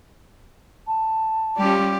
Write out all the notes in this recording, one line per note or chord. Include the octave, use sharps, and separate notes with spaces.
A5
G3 C#4 F4 G4 D5